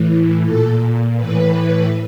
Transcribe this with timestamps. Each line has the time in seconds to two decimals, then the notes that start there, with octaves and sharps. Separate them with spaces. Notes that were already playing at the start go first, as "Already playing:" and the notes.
Already playing: A2 E3
0.43 A#2 A4
1.17 A2 E3 B4